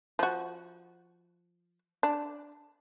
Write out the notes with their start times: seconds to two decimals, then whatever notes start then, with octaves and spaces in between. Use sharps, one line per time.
0.19 F3 F#4
2.03 D4